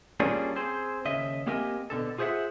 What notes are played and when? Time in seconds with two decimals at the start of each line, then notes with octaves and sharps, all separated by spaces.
0.20 G3 A#3 C#4 D4 F4 G#4
0.56 C4 G#4 C5
1.05 D#2 C#3 D#5 E5
1.47 A#3 C4 G4 A#4 D#5 G#5
1.90 B2 D3 A4
2.18 F4 G#4 C5 C#5 E5 F#5